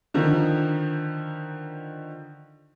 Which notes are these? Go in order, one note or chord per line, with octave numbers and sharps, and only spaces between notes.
D3 D#3 F3